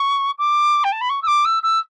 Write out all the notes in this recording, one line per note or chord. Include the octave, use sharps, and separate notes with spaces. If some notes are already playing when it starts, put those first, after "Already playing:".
Already playing: C#6
D6
G5
A5
B5
C#6
E6
D6
E6
E6